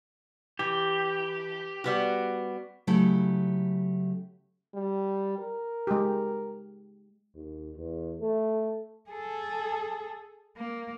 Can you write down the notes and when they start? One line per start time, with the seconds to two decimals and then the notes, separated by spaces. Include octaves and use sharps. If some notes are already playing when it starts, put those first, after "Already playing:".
0.59 E3 G4
1.84 G3 B3 F#4
2.87 C#3 F#3 A3 E4 G4 A4
4.74 G3
5.38 A#4
5.87 G#3 G4
7.35 D#2
7.76 E2
8.20 A3
9.10 G#4 A4
10.56 A#3